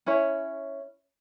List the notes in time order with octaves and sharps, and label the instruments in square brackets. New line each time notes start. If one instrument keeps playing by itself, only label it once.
[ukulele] C#4 E4 C#5